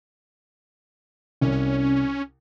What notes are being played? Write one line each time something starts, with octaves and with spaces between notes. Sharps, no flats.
C2 C#4